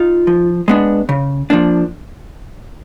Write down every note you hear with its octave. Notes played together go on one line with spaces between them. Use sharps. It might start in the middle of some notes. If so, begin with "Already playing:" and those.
Already playing: D#4 F4
F3
G#3 B3 D4
C#3
F3 A#3 D4